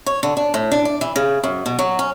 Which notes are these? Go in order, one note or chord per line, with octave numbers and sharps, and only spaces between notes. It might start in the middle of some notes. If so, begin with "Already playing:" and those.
C#5
D3
D4
A2
D4
D5
E3
C#3
F#2
B2
F#3
C#4